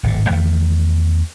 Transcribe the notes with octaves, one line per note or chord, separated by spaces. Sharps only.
D1 G#1 D3
E2 D#3 A3